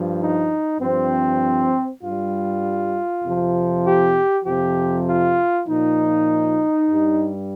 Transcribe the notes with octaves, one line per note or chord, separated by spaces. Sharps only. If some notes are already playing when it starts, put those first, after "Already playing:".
Already playing: G2 F3
D#4
G2 F3 C4
G2 G3 F4
F2 C3 F3
G4
F2 C3 F3 G4
F4
A#2 F3 D#4
G2 G3